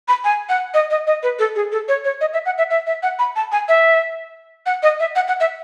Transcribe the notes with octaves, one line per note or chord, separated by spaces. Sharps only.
B5
G#5
F#5
D#5
D#5
D#5
B4
A4
G#4
A4
C#5
C#5
D#5
E5
F#5
E5
E5
E5
F#5
B5
A5
G#5
E5
F#5
D#5
E5
F#5
F#5
E5